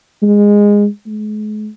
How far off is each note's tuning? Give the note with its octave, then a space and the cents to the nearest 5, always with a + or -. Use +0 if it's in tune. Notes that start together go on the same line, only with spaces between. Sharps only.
G#3 -15
G#3 +40